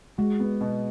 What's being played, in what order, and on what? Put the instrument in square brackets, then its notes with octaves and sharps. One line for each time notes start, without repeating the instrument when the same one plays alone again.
[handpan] G#3 [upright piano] F#4
[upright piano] B3
B2